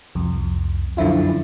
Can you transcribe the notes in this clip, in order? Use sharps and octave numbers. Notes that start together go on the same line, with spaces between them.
C2 F2
F#2 D3 F3 E4 F4